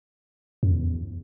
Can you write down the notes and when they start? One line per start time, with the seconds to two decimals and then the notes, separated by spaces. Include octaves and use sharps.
0.63 F#2
0.72 E2